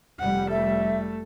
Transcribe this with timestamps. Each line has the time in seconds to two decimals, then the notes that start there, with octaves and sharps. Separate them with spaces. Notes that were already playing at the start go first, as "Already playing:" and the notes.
0.19 F1 G3 F#5
0.51 A3 A4 E5